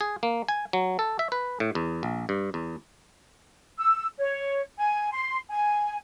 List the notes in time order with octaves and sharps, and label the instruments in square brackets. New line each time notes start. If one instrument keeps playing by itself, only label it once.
[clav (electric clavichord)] G#4
A#3
G#5
F#3
A4
E5
B4
A2
E2
A#1
G2
E2
[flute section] E6
C#5
G#5
C6
G#5